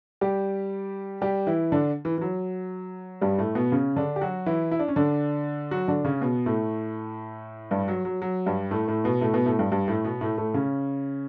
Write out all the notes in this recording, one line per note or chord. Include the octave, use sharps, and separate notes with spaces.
G3 G4
G3 G4
E3 E4
D3 D4
E3
E3
F#3
G2 G3
A2 A3
B2 B3
C#3 C#4
D3 D4
G4
F#3 F#4
E3 E4
E4
D4
C#4
D3 D4
F#3 F#4
D3 D4
C#3 C#4
B2 B3
A2 A3
G2 G3
F#3
F#3
F#3
G2 G3
A2 A3
A2 A3
B2 B3
A2 A3
B2 B3
A2 A3
G2 G3
G2 G3
A2 A3
B2 B3
A2 A3
A2 A3
C#3 C#4